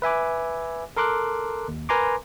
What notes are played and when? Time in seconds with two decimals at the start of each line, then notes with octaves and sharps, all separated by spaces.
0.02 B4 E5 G#5 D6
0.97 A4 A#4 C6 D6 F#6
1.68 D#2
1.89 A#4 B4 G#5 A#5 C6 D6